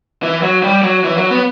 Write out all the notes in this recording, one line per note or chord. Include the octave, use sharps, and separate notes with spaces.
E3
F#3
G3
F#3
E3
F#3
B3